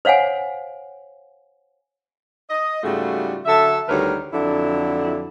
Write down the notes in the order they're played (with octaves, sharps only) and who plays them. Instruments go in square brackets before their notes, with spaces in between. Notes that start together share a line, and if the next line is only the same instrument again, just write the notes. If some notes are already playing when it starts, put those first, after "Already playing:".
[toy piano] C5 C#5 F5 F#5 G#5
[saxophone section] D#5
G#2 C#3 G3 A3 F4 F#4
D3 F#3 A4 E5
D2 D#3 G3 A#4 B4 C#5
F2 D3 F#3 D4 E4